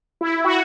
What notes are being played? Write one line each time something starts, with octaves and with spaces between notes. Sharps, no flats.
E4
F#4